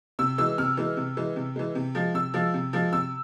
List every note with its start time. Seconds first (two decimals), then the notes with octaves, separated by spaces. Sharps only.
0.19 C3 E6
0.38 E3 G#3 E6
0.58 C3 F6
0.77 E3 G#3
0.97 C3
1.17 E3 G#3
1.36 C3
1.56 E3 G#3
1.75 C3
1.95 F3 G#3
2.14 C3 E6
2.34 F3 G#3
2.54 C3
2.73 F3 G#3
2.93 C3 E6